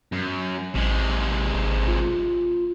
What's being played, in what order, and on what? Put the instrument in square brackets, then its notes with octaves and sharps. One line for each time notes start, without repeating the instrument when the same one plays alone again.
[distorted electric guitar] F#2
[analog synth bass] A1 [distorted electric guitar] C3 G#3
[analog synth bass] G#1
F4